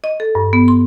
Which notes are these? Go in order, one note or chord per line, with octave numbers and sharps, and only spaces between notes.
D#5
A4
G2
B3
C6